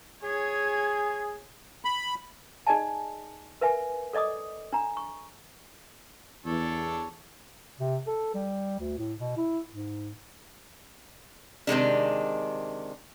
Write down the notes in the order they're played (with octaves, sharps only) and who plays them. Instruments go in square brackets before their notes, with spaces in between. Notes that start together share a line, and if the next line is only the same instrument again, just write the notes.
[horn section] G#4 [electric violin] C#5 G#6
[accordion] B5
[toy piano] D#4 G#4 D5 D#5 G#5 A5
A#4 B4 E5 G#5
A4 D5 D#5 D6 D#6
D4 A#5
C#6
[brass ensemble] E2 [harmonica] D4 A4 C#5
[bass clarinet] C3
A4
G3
D2
A2
B2
E4
G#2
[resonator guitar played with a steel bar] C3 D#3 G#3 D4